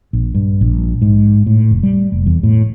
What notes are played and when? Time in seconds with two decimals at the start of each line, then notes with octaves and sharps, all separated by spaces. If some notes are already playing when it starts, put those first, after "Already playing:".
0.13 A#1
0.35 G2
0.61 A#1
1.02 G#2
1.46 A2
1.71 F1
1.83 G3
2.12 F1
2.27 E2
2.43 A2